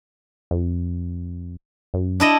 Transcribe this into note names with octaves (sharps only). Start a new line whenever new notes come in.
F2
F#2
D4 E4 D#5